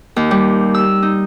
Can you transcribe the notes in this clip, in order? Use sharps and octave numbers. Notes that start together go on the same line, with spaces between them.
D#2
G3
E6
D#4